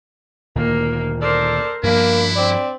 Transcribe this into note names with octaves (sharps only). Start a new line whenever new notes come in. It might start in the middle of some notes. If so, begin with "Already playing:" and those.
D2 A#2 D#3 A#3
A4 A#4 C5 D5
G2 F3 A#3 D4 E4 B5
C4 D5